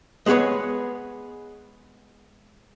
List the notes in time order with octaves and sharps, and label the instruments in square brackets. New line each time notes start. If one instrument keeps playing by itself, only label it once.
[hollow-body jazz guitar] G#3 B3 G#4 B4 C#5